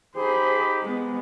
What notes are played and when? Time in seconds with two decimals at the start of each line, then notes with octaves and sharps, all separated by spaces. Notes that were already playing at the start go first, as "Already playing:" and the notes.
0.16 D#4 G4 G#4 C5 B5
0.82 G#3 B3